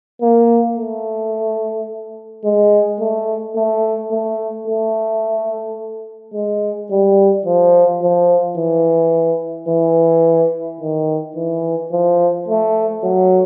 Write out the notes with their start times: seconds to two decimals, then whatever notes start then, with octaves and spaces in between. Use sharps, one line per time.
0.22 A#3
0.77 A3
2.45 G#3
3.00 A3
3.56 A3
4.12 A3
4.68 A3
6.34 G#3
6.91 G3
7.46 F3
8.03 F3
8.57 E3
9.69 E3
10.81 D#3
11.36 E3
11.92 F3
12.48 A3
13.04 F#3